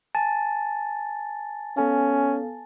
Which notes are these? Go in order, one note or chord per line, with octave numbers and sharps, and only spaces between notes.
G#5 A5 A6
B3 C#4 A4 F5